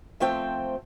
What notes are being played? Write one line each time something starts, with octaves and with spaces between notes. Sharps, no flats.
F3 A3 C4 G5